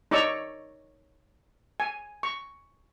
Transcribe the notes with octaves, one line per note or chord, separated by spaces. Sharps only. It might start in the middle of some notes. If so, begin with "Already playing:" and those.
D#4 C#5 D5 A#5 C#6 E6
G#5
C#6